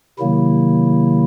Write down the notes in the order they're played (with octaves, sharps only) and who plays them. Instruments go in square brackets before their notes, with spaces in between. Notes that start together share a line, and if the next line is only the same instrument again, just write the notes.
[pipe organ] C3 D#3 F#3 A#3 E4